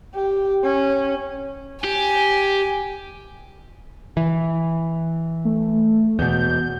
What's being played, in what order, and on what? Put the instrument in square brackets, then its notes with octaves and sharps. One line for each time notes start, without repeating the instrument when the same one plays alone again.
[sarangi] G4
C#4
[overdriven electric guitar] G4 [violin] G#5
[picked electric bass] E3
[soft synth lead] A3
[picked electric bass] E2 B2 [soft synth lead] G6